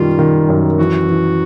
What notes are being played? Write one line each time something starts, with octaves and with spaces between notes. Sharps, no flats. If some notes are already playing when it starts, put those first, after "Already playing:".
Already playing: F#2 D#3 G3 F4
D#3
F#2
E3 F#4
E3